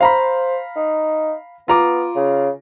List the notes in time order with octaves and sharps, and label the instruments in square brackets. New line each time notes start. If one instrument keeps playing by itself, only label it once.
[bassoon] C5 [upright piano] F5 A#5 B5
[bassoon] D#4
[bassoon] B3 [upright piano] F4 A#5 D6
[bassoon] C#3